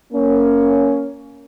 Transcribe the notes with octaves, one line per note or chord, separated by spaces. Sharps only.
A#3 C#4